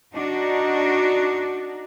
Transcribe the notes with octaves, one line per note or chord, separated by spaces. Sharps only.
D4 D#4 F#4